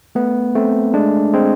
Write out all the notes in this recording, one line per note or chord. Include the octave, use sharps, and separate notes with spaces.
A3 B3
A3 C4
G#3 D4
G#3 C4